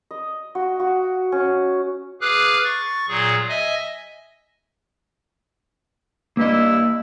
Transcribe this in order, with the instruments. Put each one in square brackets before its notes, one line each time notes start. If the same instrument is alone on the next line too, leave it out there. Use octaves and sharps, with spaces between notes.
[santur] D#5
F#4
F#4
C#4
[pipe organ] G#4 B4 F5 D6 F6 F#6
C#6 A6
A#2 F#3 G#4
D#5 E5 G#5
[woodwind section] G2 E4 [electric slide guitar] A#3 D#5